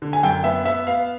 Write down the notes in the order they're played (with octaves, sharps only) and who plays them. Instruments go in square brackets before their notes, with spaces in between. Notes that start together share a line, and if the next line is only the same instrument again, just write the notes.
[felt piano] D3
G#5
F#2 G5
B3 E5
B3 E5
B3 F5